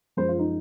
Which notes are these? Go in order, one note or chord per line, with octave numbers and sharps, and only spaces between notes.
F#2 F3 G#3 C5
F4
D#4